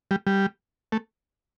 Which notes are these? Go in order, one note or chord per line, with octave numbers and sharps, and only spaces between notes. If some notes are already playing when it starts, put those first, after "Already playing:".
G3
G3
A3